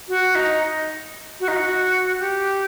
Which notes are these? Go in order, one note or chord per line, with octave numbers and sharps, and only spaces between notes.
F#4
D#4
F#4
D#4
F#4
G4